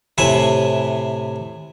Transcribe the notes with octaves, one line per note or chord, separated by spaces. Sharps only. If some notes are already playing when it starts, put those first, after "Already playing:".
A2 C3 B4 E5 G#5